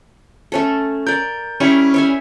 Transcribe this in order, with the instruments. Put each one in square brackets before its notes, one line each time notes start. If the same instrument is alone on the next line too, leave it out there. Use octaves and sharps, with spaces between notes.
[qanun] A3 C#4 A4
[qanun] A#4 D5 [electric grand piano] G6
[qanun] G3 G#5 C#6 [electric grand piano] C#4 E4
[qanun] C#5 E5 G#5